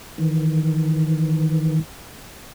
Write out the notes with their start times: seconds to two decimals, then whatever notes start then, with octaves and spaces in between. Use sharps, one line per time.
0.18 D#3 E3